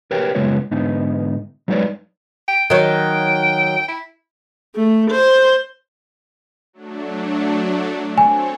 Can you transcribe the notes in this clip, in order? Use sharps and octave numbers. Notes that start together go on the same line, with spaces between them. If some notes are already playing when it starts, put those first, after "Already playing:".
G4 A#4 B4 C#5 G5
F#2 C#3 G#3 B3 F4 C#5
G#2 D3 B3 D#4
F#3 G#3 D#4 B4 C#5 D5
G5
D#3 F#3 G5
E4
A3
C5
F#3 A3 D4
C4 A4 C#5 G#5